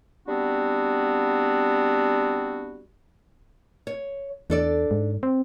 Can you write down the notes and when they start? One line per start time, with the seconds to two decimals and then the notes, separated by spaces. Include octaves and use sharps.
0.27 G3 B3 C4 D4 F#4
3.87 C#5
4.50 E2 D4 A4 D5
4.91 G#2
5.23 C4